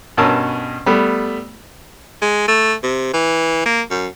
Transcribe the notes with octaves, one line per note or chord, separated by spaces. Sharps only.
G2 B2 C#4 A#4 A5 E6
G3 A3 B3
G#3
A3
C3
E3
A#3
F#2